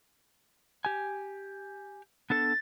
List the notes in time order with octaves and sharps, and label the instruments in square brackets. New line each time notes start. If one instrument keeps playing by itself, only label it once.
[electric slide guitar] G4 G#5
[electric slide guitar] B3 D4 A4 [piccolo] A6